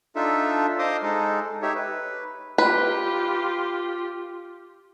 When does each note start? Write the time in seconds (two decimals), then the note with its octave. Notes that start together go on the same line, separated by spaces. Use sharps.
0.16 D4 D#4 F4 A4 E5
0.79 C5 D#5 F5 C6 D6 D#6
1.03 G#3 D#4 A4
1.62 D#4 G4 C#5 E5
1.75 B4
2.58 F4 G4 B4